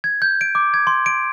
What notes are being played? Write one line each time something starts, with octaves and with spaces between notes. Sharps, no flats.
G#6
G6
D7
D6
G#6
C6
D7